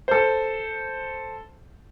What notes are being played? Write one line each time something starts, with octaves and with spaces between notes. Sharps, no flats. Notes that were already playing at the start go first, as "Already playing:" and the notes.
A4 C5